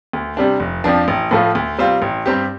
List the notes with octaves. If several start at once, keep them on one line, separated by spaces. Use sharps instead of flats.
D2
C3 G3 D4
F1
F2 F3 D4
A1
A2 F3 A3 F4
D2
C3 G3 C4 F4
A1
G2 G3 C4 G4